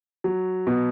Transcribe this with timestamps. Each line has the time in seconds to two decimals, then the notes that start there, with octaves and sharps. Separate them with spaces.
0.24 F#3
0.67 B2